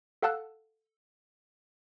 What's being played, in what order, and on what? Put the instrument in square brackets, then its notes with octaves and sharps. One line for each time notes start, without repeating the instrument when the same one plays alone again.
[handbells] A4 F5 F#5 A5 E6 F#6